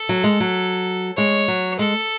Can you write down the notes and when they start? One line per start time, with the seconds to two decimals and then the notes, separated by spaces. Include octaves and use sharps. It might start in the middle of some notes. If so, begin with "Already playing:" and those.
Already playing: A4
0.09 F#3
0.24 G#3
0.40 F#3
1.17 G#3 C#5
1.48 F#3
1.79 G#3 A4